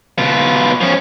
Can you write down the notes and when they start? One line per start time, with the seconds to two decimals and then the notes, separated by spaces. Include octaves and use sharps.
0.18 B2 F4
0.81 F3 C#4